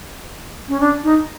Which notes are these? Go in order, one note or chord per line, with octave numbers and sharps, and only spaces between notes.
C#4
D4
D#4